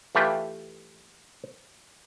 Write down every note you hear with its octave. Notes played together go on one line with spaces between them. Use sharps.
E3 A3 F4 G4 B4